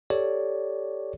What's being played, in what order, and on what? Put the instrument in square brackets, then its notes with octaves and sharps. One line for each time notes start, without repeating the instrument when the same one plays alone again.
[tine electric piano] G4 A4 C#5 D5